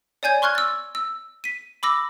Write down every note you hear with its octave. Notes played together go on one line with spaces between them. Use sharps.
C#5 D5 G#5 G6 G#6
C6 C#6 F6 F#6 G#6
E6 A6
E6
B6 D#7
B5 D6 E6 A#6